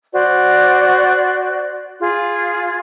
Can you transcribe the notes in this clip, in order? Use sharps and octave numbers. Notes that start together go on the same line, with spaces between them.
F#4 C5 D5
F4 G#4